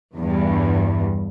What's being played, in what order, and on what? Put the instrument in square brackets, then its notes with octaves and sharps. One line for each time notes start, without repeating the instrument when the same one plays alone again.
[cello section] E2 G2